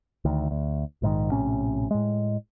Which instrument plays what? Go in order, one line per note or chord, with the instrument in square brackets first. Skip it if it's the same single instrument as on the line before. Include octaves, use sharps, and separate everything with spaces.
[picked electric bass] D2 D#3
D2
A#1 G#2 D3 D#3
A#1 A2 C3 C#4
A2 G#3